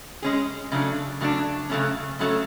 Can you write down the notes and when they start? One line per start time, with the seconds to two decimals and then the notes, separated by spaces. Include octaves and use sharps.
0.22 G#3 C#4 G#4
0.72 C#3 F#3 A3 D4
1.21 C#3 F#3 A3 D4
1.70 C#3 F#3 A3 C#4
2.19 C#3 F#3 A3 C#4